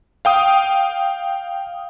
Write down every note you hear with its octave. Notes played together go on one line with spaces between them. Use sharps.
F5 G5 D#6